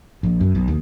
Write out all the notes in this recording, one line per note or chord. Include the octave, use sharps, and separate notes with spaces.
A#1
F#2
B1
D#2